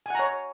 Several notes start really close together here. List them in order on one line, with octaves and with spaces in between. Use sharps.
G#5 F#5 A#5 C#5